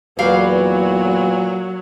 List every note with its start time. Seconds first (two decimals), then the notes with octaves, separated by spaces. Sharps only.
0.19 E2 A#2 F#3 G3 B4 F5